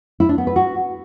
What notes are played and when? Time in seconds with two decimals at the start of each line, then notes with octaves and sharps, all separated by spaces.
0.20 E4
0.29 D4
0.38 B3
0.47 B4
0.56 F#4